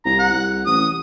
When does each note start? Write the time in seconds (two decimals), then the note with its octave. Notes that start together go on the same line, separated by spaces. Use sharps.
0.05 C2 A#5
0.19 F#5
0.32 C2
0.66 A1 D#6